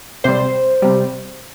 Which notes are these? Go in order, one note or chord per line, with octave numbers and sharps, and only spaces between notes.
C3 G3 C5
C3 G3